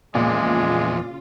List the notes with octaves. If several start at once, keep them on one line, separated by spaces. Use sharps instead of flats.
E2 A#2 C#3 F3 G#3 F4